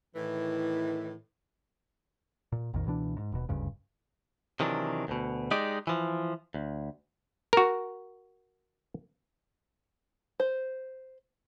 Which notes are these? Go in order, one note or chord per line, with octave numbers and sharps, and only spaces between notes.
A2 D#3 E3
A#2
A#1 F2 A#2 D#3
C#2 B2 E3 D4
G#2
D#1 B2
F#1 D2 G2 C#3
C3 D#3 E3 F#3 D4
D2 B2
G#3 D#4 G4 D5
E3 F3
D2
F#4 A#4
C5